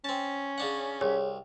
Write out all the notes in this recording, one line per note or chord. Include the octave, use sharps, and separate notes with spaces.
C4 C#4 A5
C#3 D4 F#5
C2 G#4 C#5